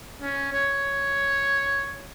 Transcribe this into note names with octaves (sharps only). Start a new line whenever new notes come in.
C#4
C#5